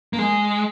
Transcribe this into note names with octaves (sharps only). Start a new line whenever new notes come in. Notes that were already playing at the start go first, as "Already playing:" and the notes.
A#3
G#3